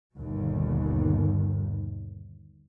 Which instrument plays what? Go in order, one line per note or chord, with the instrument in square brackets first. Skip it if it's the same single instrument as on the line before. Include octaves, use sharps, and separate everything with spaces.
[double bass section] G1 D#2 B2